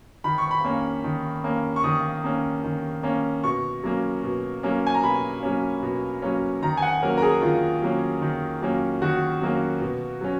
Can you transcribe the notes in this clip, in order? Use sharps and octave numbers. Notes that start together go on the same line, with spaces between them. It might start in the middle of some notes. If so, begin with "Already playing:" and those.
D#3 B5
C#6
B5
A#3 C#4
D#3
A#3 C#4
C#6
D#3 D#6
A#3 C#4
D#3
A#3 C#4
B2 C#6
F#3 A#3 C#4
B2
F#3 A#3 C#4
G#5
A#5
B2 B5
F#3 A#3 C#4
B2
F#3 A#3 C#4
D#3 A#5
G#5
F#5
F#3 A#3 C#4 A#4
A#4
G#4
D#3 F4
F#3 A#3 C#4
D#3
F#3 A#3 C#4
D#3 F#4
F#3 A#3 C#4
B2
F#3 C#4